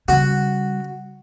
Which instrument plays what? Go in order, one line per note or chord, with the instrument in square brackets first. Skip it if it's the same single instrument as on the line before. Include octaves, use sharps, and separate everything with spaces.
[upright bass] C#3 G3 [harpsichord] F#4